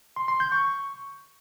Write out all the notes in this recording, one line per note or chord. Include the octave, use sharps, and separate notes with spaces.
C6
C6
G6
C#6